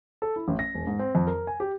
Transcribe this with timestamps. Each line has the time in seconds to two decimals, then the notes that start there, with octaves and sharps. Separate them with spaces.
0.22 A4
0.36 E4
0.48 A1
0.59 A#6
0.74 E1
0.87 G#2
0.99 C4
1.15 F2
1.27 A#4
1.47 G#5
1.60 G4